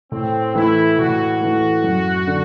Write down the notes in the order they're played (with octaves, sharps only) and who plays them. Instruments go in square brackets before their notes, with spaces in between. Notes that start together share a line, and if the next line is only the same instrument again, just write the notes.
[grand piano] A2 [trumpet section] C4
[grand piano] E3 A3 [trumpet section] E4
[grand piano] A2 [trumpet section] F#4
[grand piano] E3 A3
F#2
D3